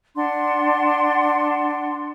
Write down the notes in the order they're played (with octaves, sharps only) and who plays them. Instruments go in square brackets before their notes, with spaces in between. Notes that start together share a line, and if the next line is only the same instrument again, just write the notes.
[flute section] D4 F#5 C6